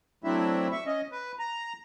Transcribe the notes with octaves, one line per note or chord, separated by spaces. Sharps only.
F#3 A3 C4 D4 E4 E5
E5 C#6
C#4 D#5
B4
A#5